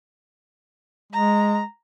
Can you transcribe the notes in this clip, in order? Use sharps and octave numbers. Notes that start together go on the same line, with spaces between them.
G#3 A#5